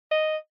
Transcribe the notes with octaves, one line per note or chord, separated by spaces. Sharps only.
D#5